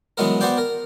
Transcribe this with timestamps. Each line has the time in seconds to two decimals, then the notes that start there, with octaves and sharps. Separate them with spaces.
0.17 E3 F#3 G#3 B3 A#4
0.41 B3 F#4 C5 D5 G5
0.58 A#4